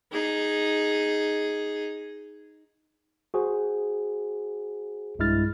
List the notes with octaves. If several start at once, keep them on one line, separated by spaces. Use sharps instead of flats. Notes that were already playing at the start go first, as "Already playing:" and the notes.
D#4 G#4
F#4 G#4 C5
B1 G2 G#3 E4 F6 A6